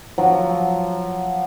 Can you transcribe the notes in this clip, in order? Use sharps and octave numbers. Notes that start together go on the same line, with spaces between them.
F3 F#3